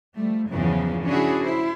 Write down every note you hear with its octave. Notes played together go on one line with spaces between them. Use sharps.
F3 G3 A3
E2 G2 C#3 F3 F#3
C#4 D4 E4 F#4 G#4 C#5
E4 C5